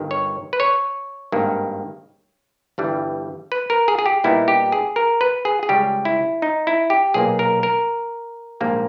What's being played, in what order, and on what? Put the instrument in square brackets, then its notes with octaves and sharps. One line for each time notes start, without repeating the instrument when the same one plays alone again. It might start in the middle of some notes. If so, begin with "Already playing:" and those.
Already playing: [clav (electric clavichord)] G1 G2 D#3
C#5
B4
C#5
G#1 G2 D#3 A#3
G1 G2 E3 G3
B4
A#4
G#4
G#4
G4
A#2 G3 B3 D#4 E4
G4
G#4
A#4
B4
G#4
G#4
C#2 C#3 G3 G4
E4
D#4
E4
G4
B1 A#2 A#3 G#4
A#4
A#4
A#1 G#2 G3 A#3